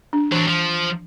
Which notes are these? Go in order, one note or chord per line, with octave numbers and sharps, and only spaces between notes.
D4
E3 F#3 D4
F3